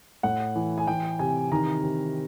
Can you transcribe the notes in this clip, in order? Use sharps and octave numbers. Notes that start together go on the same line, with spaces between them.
A2 F#5
E3
G#5
E3 G5
C3 G#5
D#3 A#5
C3